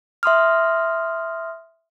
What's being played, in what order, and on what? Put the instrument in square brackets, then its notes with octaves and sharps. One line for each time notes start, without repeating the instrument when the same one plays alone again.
[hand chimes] E5 C6 D#6 F6